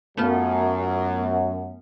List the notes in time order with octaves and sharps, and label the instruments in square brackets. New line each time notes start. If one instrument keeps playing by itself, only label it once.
[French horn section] F#2 [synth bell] A3 B3 F4